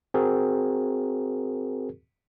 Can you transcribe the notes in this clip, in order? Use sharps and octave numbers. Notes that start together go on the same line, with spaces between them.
C4 F#4 G#4 A#4